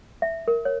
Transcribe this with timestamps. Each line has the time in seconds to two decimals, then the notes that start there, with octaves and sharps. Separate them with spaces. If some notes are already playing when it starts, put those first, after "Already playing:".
0.22 E5
0.48 A#4
0.65 C#5